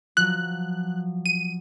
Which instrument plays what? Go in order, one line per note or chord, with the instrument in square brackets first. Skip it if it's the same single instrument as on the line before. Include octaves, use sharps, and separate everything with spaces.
[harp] F3 F#3 [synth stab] F#6
[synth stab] D#7